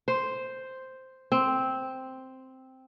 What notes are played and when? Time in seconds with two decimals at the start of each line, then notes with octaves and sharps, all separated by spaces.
0.08 C5
1.32 C4